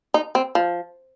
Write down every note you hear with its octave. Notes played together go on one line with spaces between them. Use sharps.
D#4
C4
F3